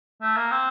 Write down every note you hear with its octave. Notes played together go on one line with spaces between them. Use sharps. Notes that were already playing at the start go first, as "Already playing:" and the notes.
A3
A#3
C4